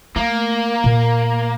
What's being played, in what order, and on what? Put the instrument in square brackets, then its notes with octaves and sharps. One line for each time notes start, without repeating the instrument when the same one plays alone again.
[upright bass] A3 [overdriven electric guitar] A#3
[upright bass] A#2